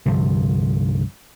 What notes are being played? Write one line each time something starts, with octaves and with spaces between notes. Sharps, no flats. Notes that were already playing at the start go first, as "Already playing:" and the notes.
C2 G2 D3 F3